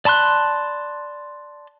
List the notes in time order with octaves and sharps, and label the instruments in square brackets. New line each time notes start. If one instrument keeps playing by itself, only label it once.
[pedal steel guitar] D5 A5 B5 C6 F#6